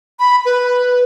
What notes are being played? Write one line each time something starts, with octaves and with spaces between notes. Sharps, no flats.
B5
B4